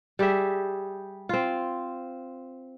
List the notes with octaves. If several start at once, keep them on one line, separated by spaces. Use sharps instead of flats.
G3 G4 G#4 E5
C4 F4